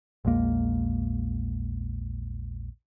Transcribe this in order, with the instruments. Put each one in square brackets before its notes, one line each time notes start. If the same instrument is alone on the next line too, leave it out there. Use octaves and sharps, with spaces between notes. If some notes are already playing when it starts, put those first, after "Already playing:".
[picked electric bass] A#1 E2 G#3 A#3